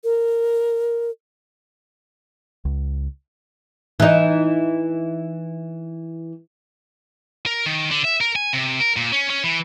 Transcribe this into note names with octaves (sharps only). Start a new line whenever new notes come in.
A#4
C#2
E3 D#4
A#4
D#3
D3
E5
A#4
G#5
C3
A#4
A#2
C#4
C#4
E3